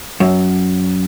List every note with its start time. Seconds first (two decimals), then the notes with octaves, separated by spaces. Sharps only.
0.20 F#2